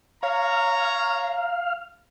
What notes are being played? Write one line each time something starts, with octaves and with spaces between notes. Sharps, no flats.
C#5 F5 A#5